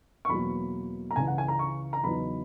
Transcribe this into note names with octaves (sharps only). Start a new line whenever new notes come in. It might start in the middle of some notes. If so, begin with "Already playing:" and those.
C#6
E2 B2 F#3 A#3 B5
A#5
C#2 C#3 E3 G#5
F#5
G#5
A#5
C#6
A#5
E2 C#3 F#3 B3 D#4 B5